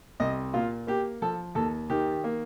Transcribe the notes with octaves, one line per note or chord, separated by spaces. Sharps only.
C2 D#5
A#2 F4
A#3 G4
F3 A4
D#2 A4
D#3 G4
A#3